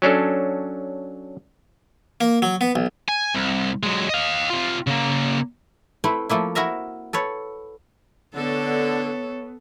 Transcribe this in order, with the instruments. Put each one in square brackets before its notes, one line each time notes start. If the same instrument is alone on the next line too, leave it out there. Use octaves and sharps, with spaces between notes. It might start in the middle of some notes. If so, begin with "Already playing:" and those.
[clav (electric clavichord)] F#3 C#4 D4 A4
[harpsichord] A#3
F#3
B3
B1
[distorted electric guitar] G#5
C2
F#3 G#3
D#5 F5
C3 F4
C#3 A#3
[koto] A3 C4 E4 B4
F3 A3 A#3 E4
E4 F#4 A#4 E5 A#5
A4 B4 C#5
[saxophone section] D3 [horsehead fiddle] B3 [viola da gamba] A4 [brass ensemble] C#5